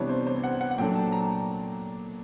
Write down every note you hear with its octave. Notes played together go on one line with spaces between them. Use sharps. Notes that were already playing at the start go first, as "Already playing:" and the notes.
Already playing: C3 E3 G3 B3 D4 C#5
C5
C5
F#5
F#5
F#5
A#2 F#3 A3 D4 G5
A5
A#5